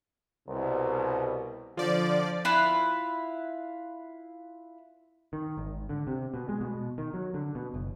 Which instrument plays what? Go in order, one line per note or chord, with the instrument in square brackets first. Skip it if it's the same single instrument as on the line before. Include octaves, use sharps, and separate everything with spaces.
[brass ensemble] C2 B2
[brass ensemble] D3 [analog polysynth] F3 D5
[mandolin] E4 F4 B4
[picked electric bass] D#3
G#1
D3
C3
B2
G#3
B2
D#3
F#3
D3
B2
F#1